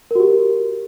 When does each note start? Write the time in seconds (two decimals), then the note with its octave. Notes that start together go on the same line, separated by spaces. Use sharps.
0.11 A#4
0.15 F#4
0.20 G4